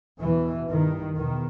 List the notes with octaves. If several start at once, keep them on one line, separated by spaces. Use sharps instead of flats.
E2 B2 E3
G2 D#3
E2 B2 D#3